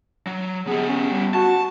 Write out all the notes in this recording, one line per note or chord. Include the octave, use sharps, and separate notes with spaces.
F#3
B3 G4 G#4
C#4
G3
F#4 A5